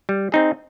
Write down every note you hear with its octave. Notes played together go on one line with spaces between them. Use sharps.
G3
C4 D#4 G#4